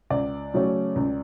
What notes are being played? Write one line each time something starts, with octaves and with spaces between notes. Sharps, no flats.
C#2 D5
C#3 F#3 A3 C#4
C#2